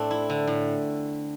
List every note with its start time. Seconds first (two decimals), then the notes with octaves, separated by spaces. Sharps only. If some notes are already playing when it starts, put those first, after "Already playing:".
Already playing: A2 A3 C4 D4
0.11 E4
0.30 D3
0.47 A2